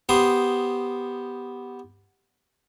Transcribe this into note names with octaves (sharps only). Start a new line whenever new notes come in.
B3 G4 C5 D#6